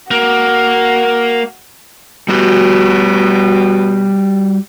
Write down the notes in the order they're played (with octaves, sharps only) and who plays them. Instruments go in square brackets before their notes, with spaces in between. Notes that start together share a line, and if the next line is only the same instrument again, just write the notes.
[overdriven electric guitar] A#3 [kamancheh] F#4
[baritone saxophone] B2 [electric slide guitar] G3 F#4 G4